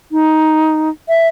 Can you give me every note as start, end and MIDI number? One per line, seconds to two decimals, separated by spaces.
0.12 0.89 63
1.09 1.28 76